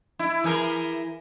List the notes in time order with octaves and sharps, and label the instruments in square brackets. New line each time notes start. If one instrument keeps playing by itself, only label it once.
[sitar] E4
E3 G#4 A#4